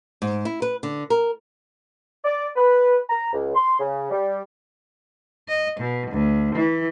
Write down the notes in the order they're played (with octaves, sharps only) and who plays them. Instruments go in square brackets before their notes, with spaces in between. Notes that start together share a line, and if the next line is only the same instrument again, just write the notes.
[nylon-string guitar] G#2
E4
B4
D3
A#4
[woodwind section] D5
B4
A#5
C#2
C6
C#3
G3
[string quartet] D#5
B2
D2
E3